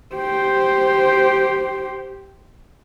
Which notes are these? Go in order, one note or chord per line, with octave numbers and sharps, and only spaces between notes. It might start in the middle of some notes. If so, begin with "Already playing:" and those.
G4 C5